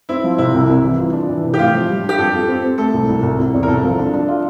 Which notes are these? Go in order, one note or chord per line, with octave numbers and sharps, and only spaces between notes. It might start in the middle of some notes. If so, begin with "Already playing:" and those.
C4 E4
F3
C3 E4
C2
C2
E3
F4
D4
E3
C3
G4
A2 F4
F3
G3
D4
G4
F2 A4
F2
C4
C4
A3 A4
C2
C2
C2
C3
E2
A#4
C2 A4
F3
D4
D4
F4